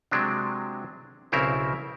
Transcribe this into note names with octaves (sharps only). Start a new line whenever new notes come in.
C3 F#3 G#3 C4 D4
B1 C#3 C4 E4 A#4 C5